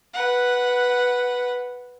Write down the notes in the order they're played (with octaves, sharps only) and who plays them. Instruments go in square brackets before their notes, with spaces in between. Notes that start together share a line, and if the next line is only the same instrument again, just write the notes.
[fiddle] B4 F#5